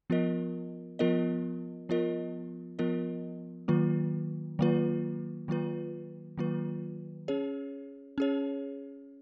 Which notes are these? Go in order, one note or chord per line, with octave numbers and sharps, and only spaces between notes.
F3 B3 F4 A#4 D#5
F3 B3 F4 A#4 D#5
F3 B3 F4 A#4 D#5
F3 B3 F4 A#4 D#5
D#3 F#3 A#3 F4 B4
D#3 F#3 A#3 F4 B4
D#3 F#3 A#3 F4 B4
D#3 F#3 A#3 F4 B4
C#4 G#4 C#5
C#4 G#4 C#5